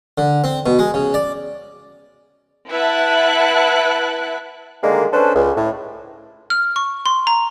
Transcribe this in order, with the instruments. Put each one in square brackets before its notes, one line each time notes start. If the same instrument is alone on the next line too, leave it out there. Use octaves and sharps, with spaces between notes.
[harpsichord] D3
C4
B2
G#3
C#3
D5
[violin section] E4 B4 E5 F#5 A5 F#6
[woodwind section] D3 D#3 G3 G#3 A#3
C#4 D4 A4 B4 C5
C#2
A2
[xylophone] F6
C#6
C6
A#5